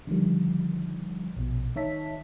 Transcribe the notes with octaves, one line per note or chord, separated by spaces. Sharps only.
D3 D#3 F3 G3
A#1 B2
D#3 D#4 C#5 E5 A5 B6